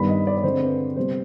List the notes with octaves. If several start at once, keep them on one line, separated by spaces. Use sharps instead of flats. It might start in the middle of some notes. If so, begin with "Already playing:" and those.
Already playing: G2 D#3 B3 B5
D#5
D5
D5
D3 G#3 C4 C5
B4
C3 G3 B3 C5